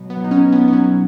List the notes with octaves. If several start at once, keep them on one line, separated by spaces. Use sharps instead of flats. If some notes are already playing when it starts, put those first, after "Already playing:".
Already playing: B2 F#3
B3
F#3
D#4
C#4
B2
B3
B3
F#3 C#4